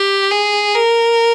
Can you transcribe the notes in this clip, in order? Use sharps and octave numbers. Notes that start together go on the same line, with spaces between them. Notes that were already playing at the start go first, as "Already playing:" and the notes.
Already playing: G4
G#4
A#4